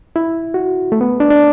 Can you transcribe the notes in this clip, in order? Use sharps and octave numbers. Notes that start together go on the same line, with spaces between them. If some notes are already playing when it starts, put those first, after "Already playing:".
E4
F#4
A3
B3
D4
D4